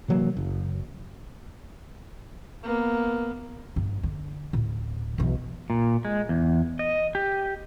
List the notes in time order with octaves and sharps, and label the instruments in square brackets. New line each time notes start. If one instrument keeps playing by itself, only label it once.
[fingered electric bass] C3 E3 F#3 A#3
F#1
[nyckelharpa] A#3 B3
[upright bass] G2
D3
D1
B1 E3
[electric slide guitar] A#2
G#3
E2
D#5
G4